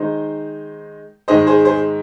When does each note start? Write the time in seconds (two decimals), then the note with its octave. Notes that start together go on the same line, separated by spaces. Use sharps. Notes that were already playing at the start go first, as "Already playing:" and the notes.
Already playing: D#3 G#3 D#4 C5
1.28 G#2 D#3 G#3 C5 D#5
1.47 G#4 C5
1.65 G#4 C5